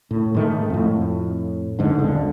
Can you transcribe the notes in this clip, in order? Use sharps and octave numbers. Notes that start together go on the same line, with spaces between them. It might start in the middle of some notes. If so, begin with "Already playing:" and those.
A2
G#2 D#3 A3
F2 A2
G#1 C#2 G#2 D3
D#1 G#1 D3